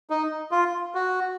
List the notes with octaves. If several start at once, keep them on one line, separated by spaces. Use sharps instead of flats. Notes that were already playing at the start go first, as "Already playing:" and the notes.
D#4
F4
F#4